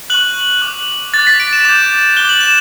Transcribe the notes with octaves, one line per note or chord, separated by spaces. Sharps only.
C#6 F#6 F#7
D6 F#6
D6 F#6 A6
B6
D7
E7
D6 G6 E7
D6 F#6 G7
F#7
E7